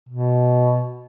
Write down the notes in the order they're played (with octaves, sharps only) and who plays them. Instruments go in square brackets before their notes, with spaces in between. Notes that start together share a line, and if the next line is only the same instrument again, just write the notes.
[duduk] B2